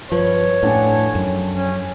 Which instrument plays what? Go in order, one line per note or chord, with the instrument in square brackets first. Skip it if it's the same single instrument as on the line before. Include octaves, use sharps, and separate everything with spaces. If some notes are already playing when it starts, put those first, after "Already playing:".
[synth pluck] G2 B4 [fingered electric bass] F3 [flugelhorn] C#5
[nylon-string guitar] F2 D4 G#5 [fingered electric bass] A2 [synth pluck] F#5 A5
[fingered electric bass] F#2
[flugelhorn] C#4